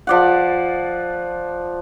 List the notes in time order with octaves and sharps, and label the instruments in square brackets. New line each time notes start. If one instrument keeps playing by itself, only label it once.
[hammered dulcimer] F3 D5 F#5